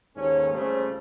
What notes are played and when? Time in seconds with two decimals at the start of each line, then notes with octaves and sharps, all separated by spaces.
0.17 D#2 G#2 C#4 A4 C#5
0.53 C#2 C#3 G3 A3 C4 C5